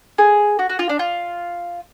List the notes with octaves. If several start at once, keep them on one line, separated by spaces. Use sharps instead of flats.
G#4
F#4
F#4
F4
D4
F4